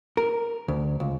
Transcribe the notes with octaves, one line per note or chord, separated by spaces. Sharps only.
A#4
D2
C#2